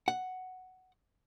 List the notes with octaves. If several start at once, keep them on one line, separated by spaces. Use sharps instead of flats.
F#5